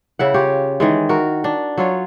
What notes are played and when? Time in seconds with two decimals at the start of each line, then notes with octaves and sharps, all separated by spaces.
0.19 C#3 E4 F#5
0.34 F4 G4 C#5
0.80 D#3 E3 G#3
1.09 F#4 A#4
1.44 D4
1.78 F#3 F4 C#5